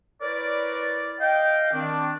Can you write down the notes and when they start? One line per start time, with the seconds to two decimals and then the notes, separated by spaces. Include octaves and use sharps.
0.21 E4 A#4 B4 C#5 D5
1.20 D#5 F5 G5
1.73 D#3 C4 D4